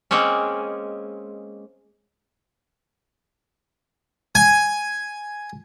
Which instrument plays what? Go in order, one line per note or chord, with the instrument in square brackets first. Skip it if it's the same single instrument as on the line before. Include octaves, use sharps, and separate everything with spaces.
[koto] G#3 A#3 C4 C#4
[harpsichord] G#5